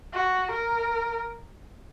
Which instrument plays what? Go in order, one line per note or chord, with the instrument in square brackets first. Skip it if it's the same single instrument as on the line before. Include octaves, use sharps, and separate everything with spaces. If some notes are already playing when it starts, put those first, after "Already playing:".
[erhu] F#4
A#4